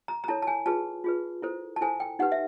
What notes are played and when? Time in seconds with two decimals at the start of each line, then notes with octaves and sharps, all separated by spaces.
0.08 A#5
0.24 A#5
0.28 E4 A4 C#5 A5
0.42 A5
0.47 G#5
0.66 F4 G#4 B4 A5
1.04 F4 G#4 B4
1.42 E4 A4 C5
1.76 A5
1.81 E4 A4 C5 G#5
2.00 G5
2.19 D#4 G4 B4 F#5
2.32 E5